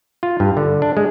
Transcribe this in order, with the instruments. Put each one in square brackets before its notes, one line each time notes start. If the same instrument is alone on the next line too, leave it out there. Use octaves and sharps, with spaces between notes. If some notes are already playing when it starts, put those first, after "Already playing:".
[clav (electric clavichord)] F4
G2
D3
D4
G#3